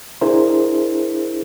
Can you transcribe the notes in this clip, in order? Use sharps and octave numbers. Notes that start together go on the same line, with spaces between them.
D4 E4 G#4 A#4 C5